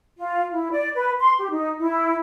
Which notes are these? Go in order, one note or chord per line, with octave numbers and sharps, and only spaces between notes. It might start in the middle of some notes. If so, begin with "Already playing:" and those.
F4
E4
D5
B4
C6
G4
D#4
E4